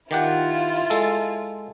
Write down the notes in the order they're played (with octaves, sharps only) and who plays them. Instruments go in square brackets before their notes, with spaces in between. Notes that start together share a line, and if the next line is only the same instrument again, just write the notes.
[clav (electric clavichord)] D#3 G4 F#5 [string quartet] E4 F4
[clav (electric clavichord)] G#3 A4